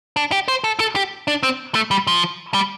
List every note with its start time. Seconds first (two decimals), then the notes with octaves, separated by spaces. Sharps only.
0.17 D4
0.32 G4
0.48 C5
0.64 A4
0.80 A4
0.96 G4
1.28 D4
1.43 C4
1.75 A3
1.91 G3
2.07 F3
2.54 G3